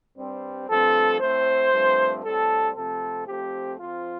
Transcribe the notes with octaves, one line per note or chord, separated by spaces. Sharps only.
G2 G3 C4
G2 F3 A3 C4 A4
A2 A3 C4 C5
G2 F3 A3 C4
A2 G3 C4 A4
C3 F3 A3 C4 A4
F2 F3 A3 C4 G4
F2 F3 C4 F4